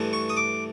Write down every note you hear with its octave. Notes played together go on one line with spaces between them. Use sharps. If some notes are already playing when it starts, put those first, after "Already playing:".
Already playing: G2 E3 A3
C#6
D#6
D6